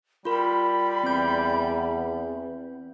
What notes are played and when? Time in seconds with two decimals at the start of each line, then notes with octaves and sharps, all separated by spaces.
0.25 G3 F4 A#4 B5
1.04 E2 C4 G6